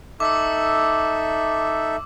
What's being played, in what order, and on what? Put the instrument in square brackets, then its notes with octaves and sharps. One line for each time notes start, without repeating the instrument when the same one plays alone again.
[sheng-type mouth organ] D#4 A4 E5 [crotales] D6 E6